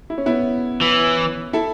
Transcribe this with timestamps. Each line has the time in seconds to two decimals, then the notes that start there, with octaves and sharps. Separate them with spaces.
0.10 E4
0.18 C#4
0.26 B3 E4
0.81 E3
1.53 E4 A4